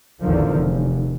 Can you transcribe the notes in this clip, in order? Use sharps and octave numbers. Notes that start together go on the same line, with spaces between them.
A1 E2 D3 D#3 F3
F1